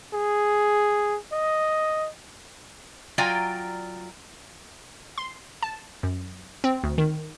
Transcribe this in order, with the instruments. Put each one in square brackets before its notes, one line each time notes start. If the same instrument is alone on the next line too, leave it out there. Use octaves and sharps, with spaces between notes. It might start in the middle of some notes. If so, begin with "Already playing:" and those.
[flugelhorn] G#4
D#5
[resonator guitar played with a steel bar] F#3 F4 D5 G5 G#5 A#5
[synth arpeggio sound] C6
A5
F#2
C4
D2
D#3